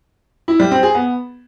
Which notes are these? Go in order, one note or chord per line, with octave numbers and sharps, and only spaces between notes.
E4
G3
C4
G#4
B3